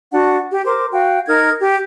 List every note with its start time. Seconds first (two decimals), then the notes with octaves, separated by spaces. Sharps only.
0.11 D4 F#4 F#5
0.51 G4
0.66 A#4 C5 D6
0.92 F#4 F5 G5
1.27 D#4 A#4 F6 G#6
1.59 G4